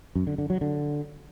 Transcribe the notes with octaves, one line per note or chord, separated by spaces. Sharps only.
F#2
D3
D3
F#3
D3